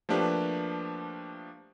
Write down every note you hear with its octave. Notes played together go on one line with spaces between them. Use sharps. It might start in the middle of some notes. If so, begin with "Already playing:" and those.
F3 A3 A#3 D4 G4 B4